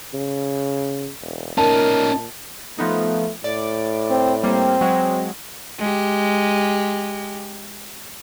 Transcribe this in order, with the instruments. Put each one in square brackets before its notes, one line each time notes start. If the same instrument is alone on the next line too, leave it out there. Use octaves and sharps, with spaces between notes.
[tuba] C#3
E1
[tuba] A#2 [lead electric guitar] C#4 D#4 [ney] A#4 [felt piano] A5
[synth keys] F3 B3 D#4 [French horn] A3
[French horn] A2 [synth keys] D5
[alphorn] C4
[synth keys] G3 A#3 [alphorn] C4
[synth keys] F#3 G#3
[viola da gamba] G#3 G4